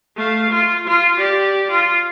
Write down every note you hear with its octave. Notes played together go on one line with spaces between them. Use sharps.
A3 F5
F4
F4
G4 D5
F4